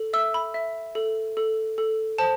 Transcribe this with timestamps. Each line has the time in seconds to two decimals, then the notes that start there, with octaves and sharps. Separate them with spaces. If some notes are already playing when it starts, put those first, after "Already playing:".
Already playing: A4
0.13 E5 E6
0.34 B5
0.54 E5
0.95 A4
1.37 A4
1.78 A4
2.18 C5 A5